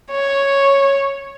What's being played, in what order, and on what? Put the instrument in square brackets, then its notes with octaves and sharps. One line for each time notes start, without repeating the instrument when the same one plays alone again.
[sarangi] C#5